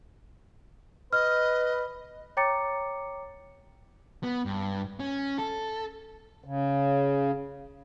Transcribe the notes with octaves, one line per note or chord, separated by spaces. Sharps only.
B4 D#5 F6
C#5 G5 A#5 D6 A6 C#7
B3
G2
C#4
A4
C#3